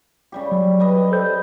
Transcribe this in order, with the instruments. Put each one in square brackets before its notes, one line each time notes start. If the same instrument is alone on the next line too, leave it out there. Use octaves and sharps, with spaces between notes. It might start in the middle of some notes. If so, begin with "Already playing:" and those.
[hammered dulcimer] C#3 G3 G4
[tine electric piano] F#3
[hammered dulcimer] G3 B4 D#5
[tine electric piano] A4 C5 G6